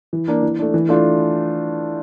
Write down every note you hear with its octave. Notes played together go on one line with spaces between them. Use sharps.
E3
A#3 D4
E3
A3 D4
E3
A3 D4 F4